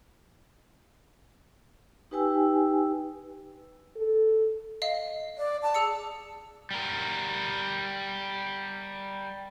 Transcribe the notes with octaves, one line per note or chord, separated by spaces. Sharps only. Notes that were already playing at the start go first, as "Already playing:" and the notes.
D#4 G4 B4 G5 G#5 E6
A4
D#5 F5
D5
A5
G#4 E6 C#7
G3 A#4